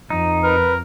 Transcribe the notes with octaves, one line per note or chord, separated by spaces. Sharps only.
F2 D#4
A#4 B4